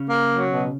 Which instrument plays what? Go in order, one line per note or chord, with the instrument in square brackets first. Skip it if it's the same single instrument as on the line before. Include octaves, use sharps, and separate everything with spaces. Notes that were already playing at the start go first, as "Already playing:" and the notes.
Already playing: [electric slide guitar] C#3 C#4
[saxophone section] A#3
F#3
B2